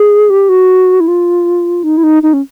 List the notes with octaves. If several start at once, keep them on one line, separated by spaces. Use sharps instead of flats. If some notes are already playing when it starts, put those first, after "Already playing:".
Already playing: G#4
G4
F#4
E4
F4
D#4
E4
D#4
D#4
C#4